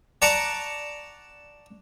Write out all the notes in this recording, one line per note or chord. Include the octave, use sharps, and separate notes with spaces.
D5 F#5 A5 A#5 C#6 D6